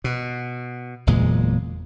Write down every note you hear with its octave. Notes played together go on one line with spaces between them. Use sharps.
B2
F#1 E2 A#2 G#3